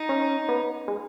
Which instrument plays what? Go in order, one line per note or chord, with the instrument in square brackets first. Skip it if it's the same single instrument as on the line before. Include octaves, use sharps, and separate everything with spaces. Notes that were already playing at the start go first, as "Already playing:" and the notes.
Already playing: [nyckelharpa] D#4
[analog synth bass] C#4
B3
G#3